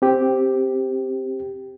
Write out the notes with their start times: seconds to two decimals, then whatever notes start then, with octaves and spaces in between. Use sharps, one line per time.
0.02 C4 G4